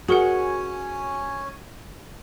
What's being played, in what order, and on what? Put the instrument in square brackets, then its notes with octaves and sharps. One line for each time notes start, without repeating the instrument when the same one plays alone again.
[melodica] C#4 C#5 G#5 [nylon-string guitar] F#4 [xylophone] G#4 A#4 F#5